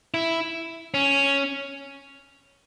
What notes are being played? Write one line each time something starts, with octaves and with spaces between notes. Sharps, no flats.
E4
C#4